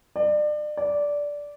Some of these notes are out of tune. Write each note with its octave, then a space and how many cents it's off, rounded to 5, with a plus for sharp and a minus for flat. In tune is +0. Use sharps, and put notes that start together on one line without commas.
D5 +35
D5 -10